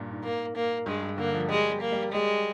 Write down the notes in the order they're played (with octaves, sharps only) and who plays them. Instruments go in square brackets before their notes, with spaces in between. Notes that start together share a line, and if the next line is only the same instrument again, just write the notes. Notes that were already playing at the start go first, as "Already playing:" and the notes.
Already playing: [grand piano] G2 A#2
G#2
[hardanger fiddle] A#3
A#3
[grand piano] G2 [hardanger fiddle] G#3
[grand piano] G2
[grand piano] D3 [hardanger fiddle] A#3
[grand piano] F3
[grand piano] G3 [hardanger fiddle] G#3
[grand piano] G3
[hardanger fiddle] A#3
[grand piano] G3
[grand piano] G3 [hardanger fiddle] G#3